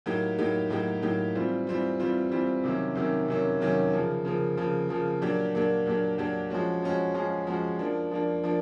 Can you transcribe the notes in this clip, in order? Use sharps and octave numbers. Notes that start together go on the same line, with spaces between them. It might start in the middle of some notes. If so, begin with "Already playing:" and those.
A2 F#3 A#3 D#4 G4
A2 F#3 A#3 D#4 G4
A2 F#3 A#3 D#4 G4
A2 F#3 A#3 D#4 G4
E3 G3 C4 F4
E3 G3 C4 F4
E3 G3 C4 F4
E3 G3 C4 F4
C3 D#3 F#3 A#3 C#4
C3 D#3 F#3 A#3 C#4
C3 D#3 F#3 A#3 C#4
C3 D#3 F#3 A#3 C#4
C#3 F3 A#3
C#3 F3 A#3
C#3 F3 A#3
C#3 F3 A#3
A#2 F#3 A#3 D4 G4
A#2 F#3 A#3 D4 G4
A#2 F#3 A#3 D4 G4
A#2 F#3 A#3 D4 G4
F3 G#3 C#4 F#4
F3 G#3 C#4 F#4
F3 G#3 C#4 F#4
F3 G#3 C#4 F#4
F3 A#3 D4
F3 A#3 D4
F3 A#3 D4